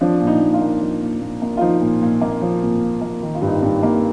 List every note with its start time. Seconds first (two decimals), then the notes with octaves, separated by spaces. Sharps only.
0.01 F3 D4
0.21 A#2
0.27 D#4
0.41 A#2
0.54 F4
0.61 A#3
0.81 F3
1.02 A#2
1.21 A#2
1.42 A#3
1.57 F4
1.61 F3 D#4
1.81 A#2
2.01 A#2
2.21 A#3
2.41 F3
2.62 A#2
2.82 A#2
3.01 A#3
3.22 D#3 D#4
3.35 F4
3.42 G2
3.47 D#4
3.62 G2
3.83 A#3